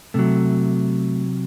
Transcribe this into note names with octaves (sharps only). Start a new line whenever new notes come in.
C3 F#3 A3